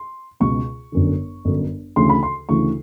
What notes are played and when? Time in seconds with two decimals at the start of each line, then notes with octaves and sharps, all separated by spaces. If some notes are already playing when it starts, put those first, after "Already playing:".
Already playing: C6
0.40 C#2 B2 C#6
0.92 G1 F#2 D3
1.45 G1 F#2 D3
1.96 D2 C#3 E3 C6
2.09 B5
2.23 C6
2.49 D2 C#3 E3 C#6